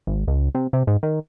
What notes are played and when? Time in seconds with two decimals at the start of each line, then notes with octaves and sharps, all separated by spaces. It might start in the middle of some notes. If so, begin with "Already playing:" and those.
0.07 G#1
0.28 C#2
0.55 C3
0.73 C3
0.87 G#2
1.03 D#3